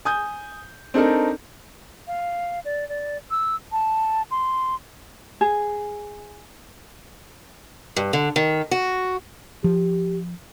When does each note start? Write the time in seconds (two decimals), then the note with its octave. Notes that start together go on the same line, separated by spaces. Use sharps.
0.05 G#5 D#6 G6
0.94 C4 D4 D#4 A4 A#4
2.07 F5
2.65 D5
2.89 D5
3.31 E6
3.72 A5
4.31 C6
5.41 G#4
7.96 G2
8.13 D3
8.36 D#3
8.71 F#4
9.64 F3 G4